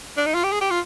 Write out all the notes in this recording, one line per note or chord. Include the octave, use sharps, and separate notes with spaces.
D4
D#4
F4
G4
G#4
G4
F4